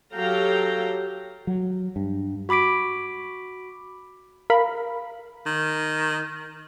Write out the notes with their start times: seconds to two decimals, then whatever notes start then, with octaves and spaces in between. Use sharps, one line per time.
0.14 F#3 G4 A4 F5 G5 A#5
1.47 F#3
1.96 G2
2.49 F#4 B5 D6 B6 D7
4.50 A#4 F5 B5
5.46 D#3